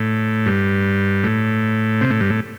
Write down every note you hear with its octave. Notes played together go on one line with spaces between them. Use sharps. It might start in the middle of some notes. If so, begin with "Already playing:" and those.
Already playing: A2
G2
A2
C3
A2
G2
A2